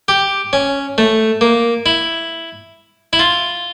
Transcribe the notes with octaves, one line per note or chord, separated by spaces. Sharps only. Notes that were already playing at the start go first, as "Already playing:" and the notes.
G4
C#4
A3
A#3
E4
E4
F4